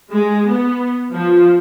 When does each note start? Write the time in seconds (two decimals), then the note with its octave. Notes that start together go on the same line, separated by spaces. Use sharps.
0.11 G#3
0.50 B3
1.12 F3